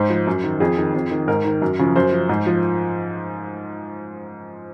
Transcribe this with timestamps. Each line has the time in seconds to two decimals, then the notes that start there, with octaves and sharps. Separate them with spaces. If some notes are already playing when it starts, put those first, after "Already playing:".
Already playing: G#2 C5
0.10 F3
0.27 F#2
0.44 D#3
0.60 F2 G#4
0.78 D#3
0.94 F2
1.11 D#3
1.28 G#2 A#4
1.45 D#3
1.62 F#2
1.79 C#3 F3
1.96 F#2 C5
2.12 F3
2.29 G#2
2.46 F3